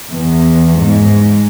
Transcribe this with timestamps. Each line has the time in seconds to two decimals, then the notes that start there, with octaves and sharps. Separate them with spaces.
0.11 E2
0.81 G#2